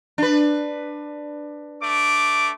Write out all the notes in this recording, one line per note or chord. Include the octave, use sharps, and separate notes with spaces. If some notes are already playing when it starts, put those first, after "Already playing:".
D4 B4
A3 D6